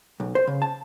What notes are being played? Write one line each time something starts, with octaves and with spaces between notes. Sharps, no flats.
B1
C5
C#3
A5